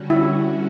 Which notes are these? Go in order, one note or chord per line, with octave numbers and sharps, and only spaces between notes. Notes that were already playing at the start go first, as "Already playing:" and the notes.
Already playing: D3 G3 C#4 F#4
E4